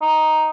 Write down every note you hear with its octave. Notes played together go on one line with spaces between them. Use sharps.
D#4